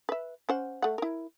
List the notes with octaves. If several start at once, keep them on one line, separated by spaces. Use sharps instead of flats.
B4 E5
C#4 C5 F#5
A3 F#5
E4 A#4